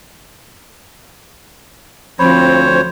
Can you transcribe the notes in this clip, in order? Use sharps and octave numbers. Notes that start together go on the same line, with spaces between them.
D2 F3 C4 C5 C#5 B5